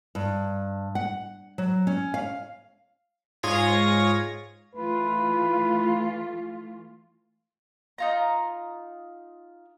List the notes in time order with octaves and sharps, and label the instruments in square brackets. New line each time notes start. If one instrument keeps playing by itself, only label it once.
[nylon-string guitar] G2
F#5
F#3
C#4
F5
[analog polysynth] G#2 F4 G#4 C#5 G#6 A#6
[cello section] E3 A3 F4 [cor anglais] B4
[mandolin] D#4 F4 A#5